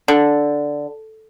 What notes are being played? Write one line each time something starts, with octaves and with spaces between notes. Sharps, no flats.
D3